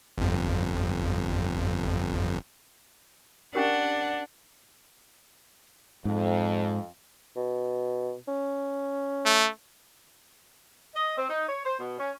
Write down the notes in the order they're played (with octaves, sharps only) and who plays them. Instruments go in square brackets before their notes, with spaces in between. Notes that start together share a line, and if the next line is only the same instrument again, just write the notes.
[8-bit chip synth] G1 F2
[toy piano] C#4 G4 A#4 [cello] D4 [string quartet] F#5
[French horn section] F2 [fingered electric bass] G#2
[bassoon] B2
C#4
[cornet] A3
[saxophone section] D#5
C4
D#4
C#5
C5
B2
C#4